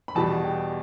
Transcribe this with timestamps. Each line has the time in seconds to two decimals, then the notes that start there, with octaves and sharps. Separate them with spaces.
0.08 B5
0.15 E2 B2 G3 A5
0.44 G5